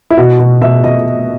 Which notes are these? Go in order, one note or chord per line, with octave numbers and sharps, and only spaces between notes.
E4
B2 F#4
B2
B2 E5
B2 D#5